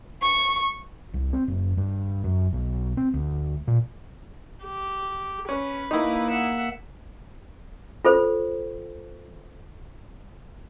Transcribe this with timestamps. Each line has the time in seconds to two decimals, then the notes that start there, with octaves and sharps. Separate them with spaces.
0.22 C#6
1.14 C2
1.33 C4
1.48 F#1
1.77 G2
2.24 F#2
2.53 B1
2.97 C4
3.14 D2
3.68 A#2
4.65 G4
5.49 C#4 B4
5.91 A#3 D#4 E4 G4 C#6
6.31 E5 F#5
8.05 F4 A4 C5